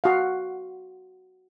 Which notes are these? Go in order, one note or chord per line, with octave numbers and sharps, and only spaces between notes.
F#4 F5